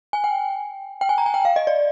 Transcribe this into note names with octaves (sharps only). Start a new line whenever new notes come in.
G#5
G5
G5
G#5
A#5
G#5
G5
F5
D#5
D5